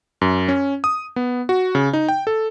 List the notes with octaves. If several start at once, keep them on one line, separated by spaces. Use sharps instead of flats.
F#2
C#4
D#6
B3
F#4
C#3
D#4
G5
A4